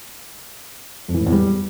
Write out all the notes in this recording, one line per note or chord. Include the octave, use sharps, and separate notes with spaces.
F2
E3
A2
E2
G3